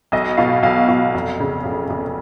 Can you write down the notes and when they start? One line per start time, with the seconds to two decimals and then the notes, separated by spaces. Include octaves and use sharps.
0.12 B1 D#5
0.37 B2 F5
0.63 B1 F5
0.88 B2 F5
1.14 F1
1.40 C#3
1.65 F1
1.90 F1